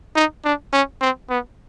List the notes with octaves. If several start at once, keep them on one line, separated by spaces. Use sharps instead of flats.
D#4
D4
C#4
C4
B3